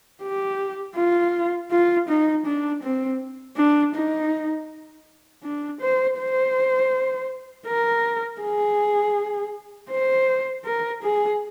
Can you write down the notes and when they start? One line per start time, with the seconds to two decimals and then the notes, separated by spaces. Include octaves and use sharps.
0.23 G4
0.96 F4
1.71 F4
2.09 D#4
2.46 D4
2.83 C4
3.57 D4
3.95 D#4
5.43 D4
5.81 C5
6.18 C5
7.67 A#4
8.41 G#4
9.91 C5
10.65 A#4
11.03 G#4